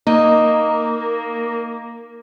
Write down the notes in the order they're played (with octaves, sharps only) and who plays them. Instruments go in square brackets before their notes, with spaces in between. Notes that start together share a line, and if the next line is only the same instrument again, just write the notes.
[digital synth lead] A#3 [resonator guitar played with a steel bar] D#4